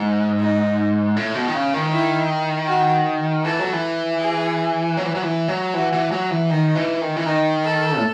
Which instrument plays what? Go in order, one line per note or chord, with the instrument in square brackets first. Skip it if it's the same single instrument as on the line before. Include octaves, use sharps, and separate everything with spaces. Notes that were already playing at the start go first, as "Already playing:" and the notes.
Already playing: [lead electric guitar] G#2
[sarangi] D#4
[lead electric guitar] A2
B2
D#3
C#3
D#3
[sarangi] E4
F#4
[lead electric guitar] E3 [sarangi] A4
[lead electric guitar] F#3
E3
[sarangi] G#4
[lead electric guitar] F#3
E3
F#3
E3
F#3
[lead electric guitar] E3 [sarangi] F#4
[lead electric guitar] E3
F#3
E3
[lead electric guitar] D#3 [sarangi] D#4
[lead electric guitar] E3
D#3
E3
[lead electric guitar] D#3 [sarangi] D#4
[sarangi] A4
[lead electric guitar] A2